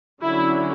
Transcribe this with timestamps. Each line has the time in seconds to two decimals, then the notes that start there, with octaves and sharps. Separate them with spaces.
0.21 D3 F#3 C#4 E4